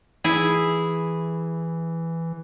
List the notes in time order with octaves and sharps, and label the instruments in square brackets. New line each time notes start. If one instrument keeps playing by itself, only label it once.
[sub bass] E3 [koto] E4 G#4